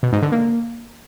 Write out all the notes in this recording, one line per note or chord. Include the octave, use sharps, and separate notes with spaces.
B2
G#2
D3
A#3